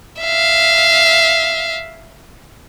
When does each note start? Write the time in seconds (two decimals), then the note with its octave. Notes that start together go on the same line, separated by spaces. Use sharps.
0.22 E5 F5